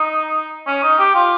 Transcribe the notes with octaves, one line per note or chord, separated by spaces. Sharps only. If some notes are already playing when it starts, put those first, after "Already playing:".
Already playing: D#4
C#4
D#4
G4
F4